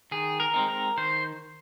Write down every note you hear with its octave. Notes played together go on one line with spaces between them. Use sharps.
D#3 G#4
A#4
G#3 C4 D#4
A#4
D#3 C5